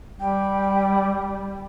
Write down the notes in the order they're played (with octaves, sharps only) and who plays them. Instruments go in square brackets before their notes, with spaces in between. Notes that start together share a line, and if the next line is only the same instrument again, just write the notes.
[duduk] G3 [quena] G5